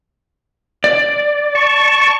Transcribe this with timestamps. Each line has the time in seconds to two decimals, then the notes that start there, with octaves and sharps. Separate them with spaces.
0.84 D5
1.55 A5 C#6